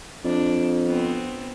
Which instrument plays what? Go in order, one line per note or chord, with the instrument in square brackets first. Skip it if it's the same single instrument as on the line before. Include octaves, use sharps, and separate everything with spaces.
[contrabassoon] F2 [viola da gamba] D4
[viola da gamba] B3 C4